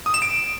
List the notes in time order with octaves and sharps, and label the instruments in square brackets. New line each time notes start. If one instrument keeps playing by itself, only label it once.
[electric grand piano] D#6
E7
D7